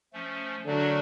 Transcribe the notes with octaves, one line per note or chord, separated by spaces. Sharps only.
F3 A3 C#4
D3 F#3 A3 D4 F#4 A#4